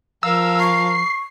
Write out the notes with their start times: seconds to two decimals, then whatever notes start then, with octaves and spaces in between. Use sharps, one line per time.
0.23 F3 A#4 F5 E6
0.60 C#6 C7